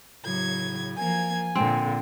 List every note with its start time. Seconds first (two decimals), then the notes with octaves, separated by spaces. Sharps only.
0.25 A2 C#3 F#3 G#6
0.97 F3 A#3 G#5 G#6
1.55 A#2 D3 C4